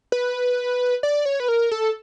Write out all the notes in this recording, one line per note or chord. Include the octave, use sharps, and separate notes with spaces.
B4
D5
C#5
B4
A#4
A4